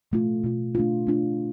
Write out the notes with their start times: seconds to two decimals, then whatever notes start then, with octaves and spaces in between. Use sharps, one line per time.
0.12 B2 A3 F4
0.44 B2 A3 F4
0.75 A3 D4 F4
1.07 A3 D4 F4